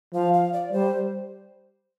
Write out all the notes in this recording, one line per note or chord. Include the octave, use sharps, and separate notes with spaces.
F3 F5
F5
D5
G3 C5